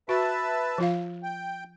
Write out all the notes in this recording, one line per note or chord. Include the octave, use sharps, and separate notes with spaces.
F#4 B4 E5 A5
F3 F4 F5
G5